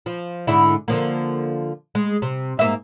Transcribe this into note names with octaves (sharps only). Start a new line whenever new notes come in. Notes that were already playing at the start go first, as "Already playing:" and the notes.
F3
G#2 D3 E4
D3 F3 A#3
G#3
C3
G#2 A#3 E5